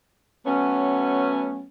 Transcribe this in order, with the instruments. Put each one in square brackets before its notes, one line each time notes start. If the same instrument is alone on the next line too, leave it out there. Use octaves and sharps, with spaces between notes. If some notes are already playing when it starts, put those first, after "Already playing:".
[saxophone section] F#3 A3 B3 C#4